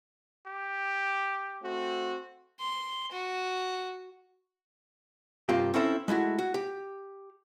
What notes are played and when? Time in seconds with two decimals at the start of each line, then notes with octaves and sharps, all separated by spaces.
0.47 G4
1.63 A3 C4 F#4
2.60 C6
3.12 F#4
5.49 G2 C3 A#3 F4 G4
5.74 C4 C#4 E4 A4 C5
6.08 G#3 A3 E4 F#4
6.39 F#4
6.54 G4